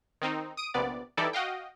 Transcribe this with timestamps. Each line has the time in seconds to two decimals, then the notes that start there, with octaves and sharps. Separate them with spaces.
0.22 D#3 C4 D#4
0.57 D#6 D7 D#7
0.74 A#1 C3 B3 D5
1.17 E3 G3 D#4 E4 A4 D5
1.33 F#4 D#5 F5 G5